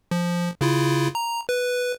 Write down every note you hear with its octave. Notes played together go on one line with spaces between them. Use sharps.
F3
C#3 E4 F4
A#5
B4